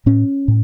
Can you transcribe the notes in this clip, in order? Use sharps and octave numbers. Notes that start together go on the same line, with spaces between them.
A2 C#4
A2